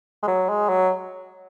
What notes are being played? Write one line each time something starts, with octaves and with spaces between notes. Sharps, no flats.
G#3
F#3
G#3
F#3